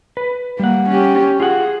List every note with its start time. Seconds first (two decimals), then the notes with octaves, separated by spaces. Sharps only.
0.17 B4
0.59 G3 A#3 F#5
0.90 C#4 G4
1.40 F4 G#4 F#5